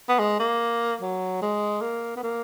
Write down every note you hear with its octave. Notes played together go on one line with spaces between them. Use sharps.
B3
G#3
A#3
F#3
G#3
A#3
B3
A#3